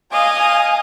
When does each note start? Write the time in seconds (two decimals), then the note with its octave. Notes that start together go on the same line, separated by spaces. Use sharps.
0.12 D#5 F5 G#5 D#6